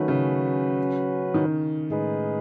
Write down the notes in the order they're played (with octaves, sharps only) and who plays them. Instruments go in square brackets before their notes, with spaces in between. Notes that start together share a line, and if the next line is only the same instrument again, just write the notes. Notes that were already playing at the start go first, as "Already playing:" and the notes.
Already playing: [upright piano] D#3 A3 [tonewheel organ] F#3 C#4 F#4 B4
[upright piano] C#3
D#3
[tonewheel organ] A2 G#3 D#4 G#4 B4